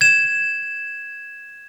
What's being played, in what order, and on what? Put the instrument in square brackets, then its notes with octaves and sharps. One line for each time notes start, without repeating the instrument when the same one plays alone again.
[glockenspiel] G#6 E7